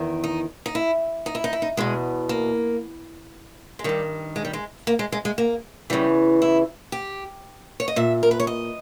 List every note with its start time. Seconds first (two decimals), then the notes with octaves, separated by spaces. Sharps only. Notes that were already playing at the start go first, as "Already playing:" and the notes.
Already playing: E2 D#3
0.24 D#4
0.66 D#4
0.75 E4
1.26 D#4
1.35 E4
1.44 D#4
1.53 E4
1.62 D#4
1.77 E2 B2 G#3
2.29 A#3
3.79 G#3
3.84 G2 D#3 G3
4.36 G#3
4.45 G3
4.53 G#3
4.87 A#3
4.99 G#3
5.12 G#3
5.25 G#3
5.38 A#3
5.90 E2 C#3 E3 G3
6.42 E4
6.92 G4
7.80 C#5
7.88 D#5
7.96 A#2 E5
8.23 A#4
8.31 B4
8.40 C#5
8.47 D#5